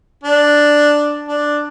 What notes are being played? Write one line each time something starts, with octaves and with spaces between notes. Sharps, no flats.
D4
D4